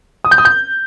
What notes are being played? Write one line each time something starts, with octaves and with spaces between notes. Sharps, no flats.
D#6
G6
D#6
G6